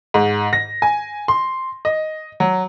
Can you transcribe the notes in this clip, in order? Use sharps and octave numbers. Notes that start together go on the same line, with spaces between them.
G#2
A#6
G#5
C6
D#5
F#3